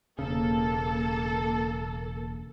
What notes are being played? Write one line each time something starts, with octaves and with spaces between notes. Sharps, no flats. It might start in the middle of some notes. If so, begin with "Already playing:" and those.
E1 C#3 A#3 A4